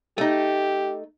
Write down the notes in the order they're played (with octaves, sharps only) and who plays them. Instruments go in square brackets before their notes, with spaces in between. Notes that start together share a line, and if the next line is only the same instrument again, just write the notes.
[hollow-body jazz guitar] A3 D#4 [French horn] G4